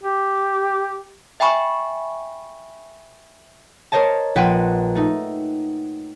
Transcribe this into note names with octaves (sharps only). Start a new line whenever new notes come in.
G4
E5 G5 G#5 B5 C#6
A#4 C5 C#5 D#5 A5
A#1 B4 F#5 G5 C6 D#7
A3 D#4